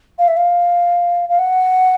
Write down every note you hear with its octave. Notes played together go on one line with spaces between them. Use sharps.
F5
E5
F5
F5
F#5